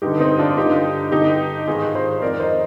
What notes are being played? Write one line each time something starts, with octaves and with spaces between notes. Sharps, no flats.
G2 D3 D#4 G4
C4 D#4
D4 F4
G2 D3 D#4 G4
G2 D3 D#4 G4
G#2 D#3 F4 G#4
G#4 C5
F2 D#3 A#4 D5
C5 D#5